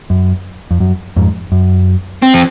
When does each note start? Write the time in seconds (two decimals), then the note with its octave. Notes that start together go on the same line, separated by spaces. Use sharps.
0.10 F#2
0.71 F2
0.80 F#2
1.16 F2 G#2
1.52 F#2
2.23 C4
2.34 F3